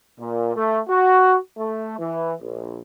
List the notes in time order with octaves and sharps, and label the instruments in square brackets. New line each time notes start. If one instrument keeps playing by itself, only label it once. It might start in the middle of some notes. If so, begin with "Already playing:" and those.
[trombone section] A#2
A3
F#4
A3
E3
A#1